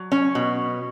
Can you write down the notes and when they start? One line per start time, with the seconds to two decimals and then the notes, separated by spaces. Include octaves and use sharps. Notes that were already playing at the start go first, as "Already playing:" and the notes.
Already playing: F#3
0.12 C#4
0.35 B2